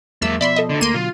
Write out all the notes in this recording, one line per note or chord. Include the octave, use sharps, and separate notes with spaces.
E2 F#3 G#3 A#3 E5 E6
B2 F3 B3 D5 E5 B5 C6
A4 D#5
D2 D3
D2 A3 A#3 C6 D#7
B2 D3 F#3 F4